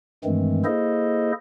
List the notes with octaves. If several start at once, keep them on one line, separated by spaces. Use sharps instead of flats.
G2 D#3 E3 G#3 A3 C4
A#3 E4 G#4 A4 C5 D#5